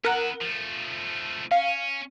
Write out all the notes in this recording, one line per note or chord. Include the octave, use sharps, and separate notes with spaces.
B3 E4 A#4 F#5
F3 A3
C#4 F5